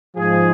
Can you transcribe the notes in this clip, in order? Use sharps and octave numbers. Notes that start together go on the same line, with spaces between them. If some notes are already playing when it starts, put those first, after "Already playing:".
G#2 F3 G#4